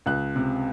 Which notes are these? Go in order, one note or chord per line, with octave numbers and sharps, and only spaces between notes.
C#2 F#6
C3